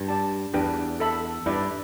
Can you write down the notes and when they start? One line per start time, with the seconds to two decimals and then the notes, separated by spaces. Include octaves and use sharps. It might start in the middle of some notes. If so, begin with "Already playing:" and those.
Already playing: G2
0.08 G4 D5 A5
0.54 E2 D4 G4 B4 G5
1.00 A4 E5 B5
1.46 G2 E4 B4 D5